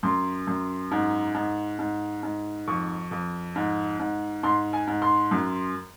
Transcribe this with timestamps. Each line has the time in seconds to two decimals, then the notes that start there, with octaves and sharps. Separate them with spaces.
0.03 F#2 C6
0.47 F#2
0.91 G#2
1.34 G#2
1.79 G#2
2.23 G#2
2.68 F2 C#6
3.11 F2
3.56 G#2
3.99 G#2
4.43 G#2 C6
4.73 G#5
4.87 G#2
5.02 C6
5.31 F#2